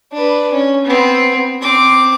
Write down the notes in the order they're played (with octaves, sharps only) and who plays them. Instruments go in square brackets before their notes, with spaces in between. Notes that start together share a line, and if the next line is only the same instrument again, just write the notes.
[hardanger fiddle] D4 B4
C#4
B3 C4
C4 D6